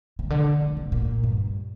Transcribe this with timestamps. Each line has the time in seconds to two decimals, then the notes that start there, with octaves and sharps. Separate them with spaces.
0.19 C3
0.30 D3
0.61 D3
0.77 C3
0.92 A#2
1.23 G2